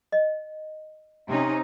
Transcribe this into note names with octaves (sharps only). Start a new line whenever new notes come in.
D#5
C3 C#4 D#4